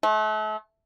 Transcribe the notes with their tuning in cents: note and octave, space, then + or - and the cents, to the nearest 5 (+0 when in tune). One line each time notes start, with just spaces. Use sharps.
A3 -35